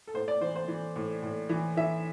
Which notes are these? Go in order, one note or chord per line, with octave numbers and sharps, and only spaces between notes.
A4
A2 C5
D5
E3 C5
C5
E3
A2
A2
E3
E3 E5